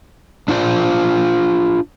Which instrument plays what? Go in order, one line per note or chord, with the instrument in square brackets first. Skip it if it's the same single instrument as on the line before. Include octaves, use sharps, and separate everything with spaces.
[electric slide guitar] D4 E4 F4 C5 D5